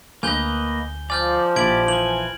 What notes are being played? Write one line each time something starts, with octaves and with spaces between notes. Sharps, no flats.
D2 A#3 B4 D#5 G#5 G6 G7
F3 D5 G#5 F6 G6
A#1 E4 G4 D5 G#6 D7 F#7
E3 G#5 F#7